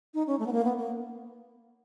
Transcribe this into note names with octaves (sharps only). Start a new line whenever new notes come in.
D#4
C#4
A3
B3
A#3
B3
A#3